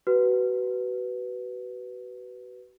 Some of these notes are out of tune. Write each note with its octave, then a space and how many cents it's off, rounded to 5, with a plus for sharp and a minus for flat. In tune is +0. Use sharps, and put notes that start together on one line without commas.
F#4 +30 B4 +0